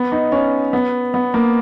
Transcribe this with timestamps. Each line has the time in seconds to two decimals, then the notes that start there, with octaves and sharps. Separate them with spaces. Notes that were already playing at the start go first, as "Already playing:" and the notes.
Already playing: B3
0.12 D#4
0.32 C#4
0.73 B3
1.14 B3
1.34 A#3